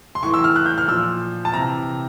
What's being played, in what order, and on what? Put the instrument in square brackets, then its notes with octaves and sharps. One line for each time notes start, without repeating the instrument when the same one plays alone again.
[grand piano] C6
A2 E3 C#6
E6
F6
F#6
G6
F6
A#2 F3 E6
A5
C3 E3 A#5